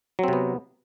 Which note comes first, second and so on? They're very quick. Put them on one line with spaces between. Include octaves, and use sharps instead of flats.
F#3 C4 C3 B3